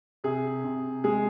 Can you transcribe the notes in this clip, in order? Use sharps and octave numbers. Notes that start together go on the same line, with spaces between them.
C3 G#4
C3
G#3 G#4